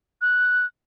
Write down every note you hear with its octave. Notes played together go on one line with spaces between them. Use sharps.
F#6